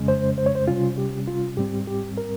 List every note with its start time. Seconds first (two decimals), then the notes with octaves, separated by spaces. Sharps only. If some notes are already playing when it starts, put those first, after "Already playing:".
Already playing: F2 C#3 G#3 C#4
0.08 C5
0.38 C5
0.46 C#5
0.55 C5
0.68 C3 G3 C#4 F4
0.98 G4
1.28 F4
1.57 G#2 G3 C4 G4
1.87 G4
2.17 A#4